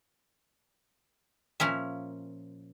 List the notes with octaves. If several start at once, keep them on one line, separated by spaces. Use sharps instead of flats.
A#2 F3 C#4 E5